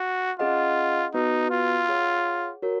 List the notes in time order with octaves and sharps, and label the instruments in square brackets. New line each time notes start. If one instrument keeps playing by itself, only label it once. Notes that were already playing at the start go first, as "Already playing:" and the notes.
Already playing: [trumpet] F#4
[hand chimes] C#4 G#4 D#5 F#5 [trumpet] F4
[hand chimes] B3 F#4 B4 [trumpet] D#4
[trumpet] F4
[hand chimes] G#4 C#5 F#5
F#4 A#4 C#5